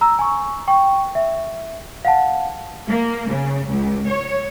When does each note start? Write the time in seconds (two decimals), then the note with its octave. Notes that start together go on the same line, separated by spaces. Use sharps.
0.01 A#5 E6
0.19 G#5 C#6
0.68 G5 C#6
1.15 E5
2.05 F5 F#5 A5
2.89 A#3
3.30 C#3
3.68 C#2
4.08 C#5